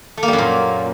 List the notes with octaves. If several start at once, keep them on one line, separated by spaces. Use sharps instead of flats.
A3
A#3
G3
F#2
A#2